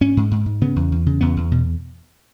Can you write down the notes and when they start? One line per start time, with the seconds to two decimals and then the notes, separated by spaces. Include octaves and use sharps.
0.01 G#2 C#4
0.17 G#2
0.31 G#2
0.46 G#2
0.61 C#3 B3
0.76 E2
0.92 E2
1.06 C#3
1.21 E2 B3
1.37 E2
1.52 B2